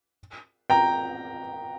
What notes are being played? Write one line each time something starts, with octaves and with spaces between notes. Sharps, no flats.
G5 A#5